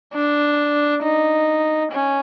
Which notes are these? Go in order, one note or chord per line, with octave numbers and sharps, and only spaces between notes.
D4
D#4
C#4